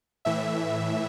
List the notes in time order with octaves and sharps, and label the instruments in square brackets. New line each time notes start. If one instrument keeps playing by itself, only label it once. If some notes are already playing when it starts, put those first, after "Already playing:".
[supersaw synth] A2 E3 E5